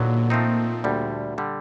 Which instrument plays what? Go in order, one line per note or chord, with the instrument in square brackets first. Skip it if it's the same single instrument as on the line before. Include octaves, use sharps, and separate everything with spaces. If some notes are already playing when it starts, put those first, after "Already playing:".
Already playing: [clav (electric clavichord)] D#2 D3 F#3 B3 [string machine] A#2
[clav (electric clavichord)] F3 A3 C4 D#4
D2 D3 G3
D3 G3